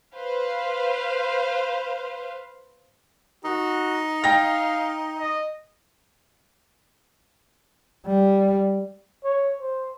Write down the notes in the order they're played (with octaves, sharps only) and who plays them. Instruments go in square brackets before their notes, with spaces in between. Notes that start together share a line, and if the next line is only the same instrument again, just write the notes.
[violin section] B4 C5 F5
[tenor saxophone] D#4 [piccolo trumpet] F#4
[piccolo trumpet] F5 [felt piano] G5 A#6
[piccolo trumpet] D#5
[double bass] G3
[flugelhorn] C#5
C5